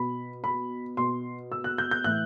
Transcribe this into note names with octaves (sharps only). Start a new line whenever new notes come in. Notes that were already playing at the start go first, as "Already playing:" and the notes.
Already playing: B2 B5
B5
B2 C6
E6
F#6
G6
G6
A2 E3 F#6